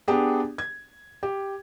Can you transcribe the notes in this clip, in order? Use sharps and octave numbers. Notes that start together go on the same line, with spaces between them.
B3 D4 G4 G#4
G#6
G4